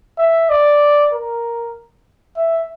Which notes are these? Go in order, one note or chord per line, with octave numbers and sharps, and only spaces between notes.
E5
D5
A#4
E5